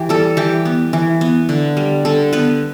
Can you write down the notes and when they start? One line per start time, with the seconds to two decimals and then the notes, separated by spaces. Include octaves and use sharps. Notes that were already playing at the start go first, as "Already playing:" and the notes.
Already playing: E3 G4
0.09 G3 A4
0.37 E3 G4
0.65 B3
0.93 E3
1.21 B3
1.49 D3
1.77 G3
2.05 D3 A4
2.33 B3 B4